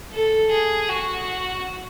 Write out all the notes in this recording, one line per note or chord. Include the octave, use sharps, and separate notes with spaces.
A4
G#4
F#4